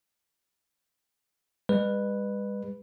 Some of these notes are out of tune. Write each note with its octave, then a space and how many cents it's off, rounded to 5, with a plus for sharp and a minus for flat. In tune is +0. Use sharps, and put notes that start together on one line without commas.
G#3 -45 B4 +0